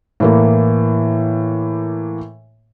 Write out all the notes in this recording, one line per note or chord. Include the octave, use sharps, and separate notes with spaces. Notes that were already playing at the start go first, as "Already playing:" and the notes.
A2 E3 A#3